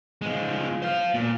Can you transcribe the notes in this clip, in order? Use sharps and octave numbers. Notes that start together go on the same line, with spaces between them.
F3 G#3
C5 F5
A#2